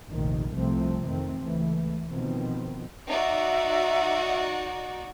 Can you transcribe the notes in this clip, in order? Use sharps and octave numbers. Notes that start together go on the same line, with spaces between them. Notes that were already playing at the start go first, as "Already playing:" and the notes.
F1 A#1 C3 D#3
C2 C3 F3 A3 C4
F2 D#3 A3 C4
C#2 E3 A3
B2 D#3 F3 B3 C4
D#4 F#4 D5 E5